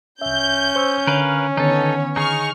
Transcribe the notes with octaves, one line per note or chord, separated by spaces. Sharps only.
C2 C#4 E5 G6
C5 C#6 E6
D3 A#4 B4 C#5 F5
D3 D#3 B3 D#4 A4 C#5
D#4 G#4 C#6 F6